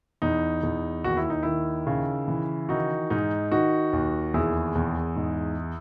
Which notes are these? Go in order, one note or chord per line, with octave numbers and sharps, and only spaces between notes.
E2 D#4
E2
D#2 F#4
E4
D#4
D#3 E4
C#3
E3
D#3 D#4 F#4
G#2 D#4
D#3 D#4 F#4
D#2
E2 E4 G#4
E2
G#2